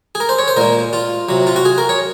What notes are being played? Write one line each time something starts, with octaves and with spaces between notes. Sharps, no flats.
G#4
A#4
C5
C#5
C5
A#2 G#3 A#4
F4
C3 F#3
F4
F#4
G#4
A#4
C#5